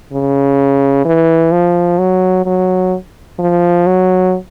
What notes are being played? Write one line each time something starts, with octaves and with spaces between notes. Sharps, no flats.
C#3
E3
F3
F#3
F#3
F3
F#3